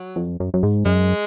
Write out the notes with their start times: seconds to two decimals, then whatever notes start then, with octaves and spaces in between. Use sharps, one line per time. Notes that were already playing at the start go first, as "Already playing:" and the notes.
Already playing: F#3
0.16 F2
0.40 F#2
0.54 F#2
0.63 G#2
0.86 F#2 G#3